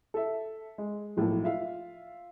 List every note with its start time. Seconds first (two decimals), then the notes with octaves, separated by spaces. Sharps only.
0.14 A4 E5
0.78 G#3
1.17 B1 A2 F3 A#3
1.44 F4 E5 F5